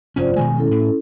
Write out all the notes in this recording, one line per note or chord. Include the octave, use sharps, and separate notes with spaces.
F1 G2 C#4 F4 C5 D5
B2 D#3 G#3 G#5
C#4 E4 A4
A2